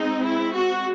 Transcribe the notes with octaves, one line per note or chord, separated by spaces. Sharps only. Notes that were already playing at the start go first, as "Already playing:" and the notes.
Already playing: G#3 C4 D#4
E4
F#4